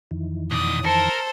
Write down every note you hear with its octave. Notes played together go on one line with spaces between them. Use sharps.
F2 D#3 E3
B2 D5 D#6
A4 A#4 C5 A5 C#7